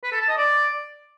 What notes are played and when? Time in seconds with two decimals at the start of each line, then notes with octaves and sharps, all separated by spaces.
0.03 B4
0.12 A4
0.20 A5
0.28 D#5
0.37 D5